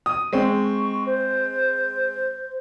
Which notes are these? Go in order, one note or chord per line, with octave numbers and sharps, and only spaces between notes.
D#6
G#3 C4 C#6
C5